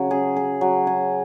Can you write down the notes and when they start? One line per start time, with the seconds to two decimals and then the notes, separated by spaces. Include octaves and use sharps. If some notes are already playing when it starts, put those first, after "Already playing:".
Already playing: C#3 F#3
0.11 G#4
0.36 G#4
0.61 F#3
0.87 G#4